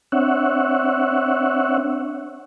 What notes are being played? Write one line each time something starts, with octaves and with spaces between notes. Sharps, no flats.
C4 D4 C#5 E5 F#5